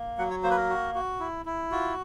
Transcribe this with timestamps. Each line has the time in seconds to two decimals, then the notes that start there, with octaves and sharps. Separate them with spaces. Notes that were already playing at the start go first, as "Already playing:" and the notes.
Already playing: A#3
0.18 F#3 F#5
0.30 C#5
0.43 A#3 C5
0.50 B4
0.56 A#4
0.69 F#4
0.95 F#4
1.20 E4
1.46 E4
1.71 F4 F#4